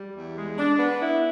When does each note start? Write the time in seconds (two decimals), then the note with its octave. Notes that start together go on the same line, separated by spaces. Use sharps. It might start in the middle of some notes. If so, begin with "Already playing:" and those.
Already playing: G3
0.14 E2
0.36 G#3
0.57 D4
0.79 B3
1.01 E4